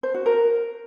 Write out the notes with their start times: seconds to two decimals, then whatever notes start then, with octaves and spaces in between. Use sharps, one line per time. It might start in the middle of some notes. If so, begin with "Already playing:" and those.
0.03 C5
0.14 F#4
0.26 A#4